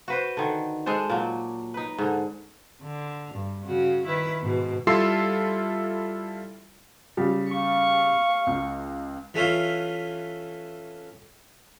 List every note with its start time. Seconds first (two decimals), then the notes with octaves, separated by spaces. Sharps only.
0.08 F#4 B4 C5
0.37 D3 D#3
0.86 G#3 D4 A4 C5
1.10 A#2 F#3
1.74 D#4 B4
1.98 G#2 D3
2.82 D3
3.35 G2
3.65 C#3 F#4
4.05 D#3 E4 B4
4.41 G#2 B2
4.87 G3 E4 F4 A4 C6 C7
7.17 C#3 G3
7.49 F5 C#6
8.47 C#2
9.34 E3 A3 C#4 F4